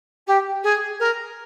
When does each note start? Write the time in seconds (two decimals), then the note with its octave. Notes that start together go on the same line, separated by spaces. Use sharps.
0.27 G4
0.63 G#4
0.99 A#4